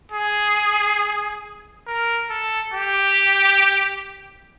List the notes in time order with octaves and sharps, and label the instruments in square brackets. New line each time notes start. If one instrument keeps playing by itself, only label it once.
[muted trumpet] G#4
A#4
A4
G4